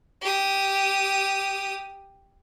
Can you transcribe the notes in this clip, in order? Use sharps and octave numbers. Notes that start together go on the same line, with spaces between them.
G4 D#6